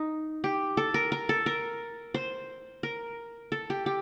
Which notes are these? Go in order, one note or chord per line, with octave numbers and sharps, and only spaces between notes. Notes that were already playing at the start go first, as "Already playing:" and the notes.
Already playing: D#4
G4
A4
A#4
A#4
A4
A#4
C5
A#4
A4
G4
G4